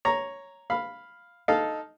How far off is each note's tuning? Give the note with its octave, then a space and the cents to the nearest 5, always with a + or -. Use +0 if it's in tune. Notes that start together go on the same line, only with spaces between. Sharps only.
C#5 +0 A#5 +0
F5 +0 B5 +0
D#4 +0 A4 -10 F5 +0